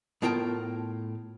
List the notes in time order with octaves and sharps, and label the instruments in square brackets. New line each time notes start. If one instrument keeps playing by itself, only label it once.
[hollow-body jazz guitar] A2 B3 F4 A#4 G5 A5